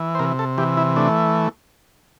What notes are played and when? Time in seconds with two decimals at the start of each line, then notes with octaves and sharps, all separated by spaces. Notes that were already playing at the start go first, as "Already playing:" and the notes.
Already playing: E3
0.15 C5
0.19 C3 A#4
0.39 A4
0.58 E3 G4
0.77 E4
0.96 A3 D4